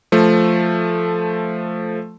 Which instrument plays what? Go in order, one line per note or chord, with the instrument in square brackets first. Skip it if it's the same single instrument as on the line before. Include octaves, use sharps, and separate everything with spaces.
[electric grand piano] F3 A3